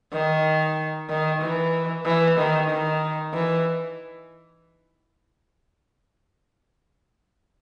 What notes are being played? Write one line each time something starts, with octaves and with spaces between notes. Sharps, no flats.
D#3
D#3
E3
E3
D#3
D#3
E3